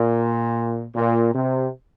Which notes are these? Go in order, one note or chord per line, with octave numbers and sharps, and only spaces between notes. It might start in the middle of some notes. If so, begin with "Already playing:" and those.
Already playing: A#2
A#2
C3